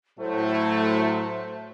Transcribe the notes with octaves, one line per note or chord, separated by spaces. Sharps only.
A2 F#3 A3 C5